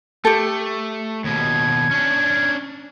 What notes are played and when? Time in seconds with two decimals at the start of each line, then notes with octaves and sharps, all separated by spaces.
0.25 A3 G4 A4
1.24 D#2 B2 G#6
1.91 C#4 D4